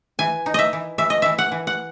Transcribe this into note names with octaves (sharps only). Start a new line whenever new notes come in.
E3 G#5
D#4
D#5 E5
E3
E3 E5
D#5
E3 E5
F#5
E3
F#5